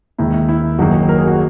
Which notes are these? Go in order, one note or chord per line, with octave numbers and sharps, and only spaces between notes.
D#2 D#3 G#3 E4
E4
E4
F#1 F#2 D#3 F#3 A#3 D#4 F#4
A#4
G#4
F#4